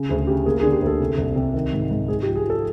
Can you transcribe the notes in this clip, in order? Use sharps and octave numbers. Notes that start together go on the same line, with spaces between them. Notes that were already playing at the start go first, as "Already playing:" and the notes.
Already playing: C#3
D2 G#4
C#3 G4
A#3 G#4
G#4
D3
G4
D2 A4
C3
C2
C3
D#3
G#2
G#2
G#2 G#4
G4
F3
G#4
F3 A4